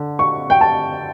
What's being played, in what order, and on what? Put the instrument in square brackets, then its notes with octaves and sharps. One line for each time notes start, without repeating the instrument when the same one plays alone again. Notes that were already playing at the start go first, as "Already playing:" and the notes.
Already playing: [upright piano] D3
C#6
G5
A5